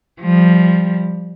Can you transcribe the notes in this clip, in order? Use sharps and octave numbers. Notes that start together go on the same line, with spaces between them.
F3 G3